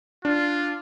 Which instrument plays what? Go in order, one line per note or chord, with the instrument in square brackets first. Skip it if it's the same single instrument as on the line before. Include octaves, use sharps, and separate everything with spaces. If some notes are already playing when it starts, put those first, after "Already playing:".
[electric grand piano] D4 [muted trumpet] F4